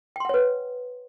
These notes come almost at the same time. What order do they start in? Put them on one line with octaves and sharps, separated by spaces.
G5 C6 F#5 C#5 B4